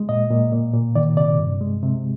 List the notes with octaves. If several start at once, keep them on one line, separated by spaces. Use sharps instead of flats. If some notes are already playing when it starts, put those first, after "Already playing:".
Already playing: G#3
A#2 D#5
A#2
A#2
A#2
D#3 D5
C3 D5
G2
G#3
C3